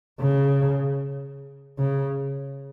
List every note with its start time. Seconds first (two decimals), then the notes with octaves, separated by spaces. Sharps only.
0.21 C#3
1.79 C#3